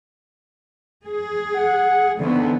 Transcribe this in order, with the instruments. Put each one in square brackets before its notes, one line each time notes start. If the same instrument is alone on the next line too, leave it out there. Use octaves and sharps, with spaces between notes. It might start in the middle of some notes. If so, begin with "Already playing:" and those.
[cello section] G#4
[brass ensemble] F#5
[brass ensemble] C2 G#2 [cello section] D3 E3 B3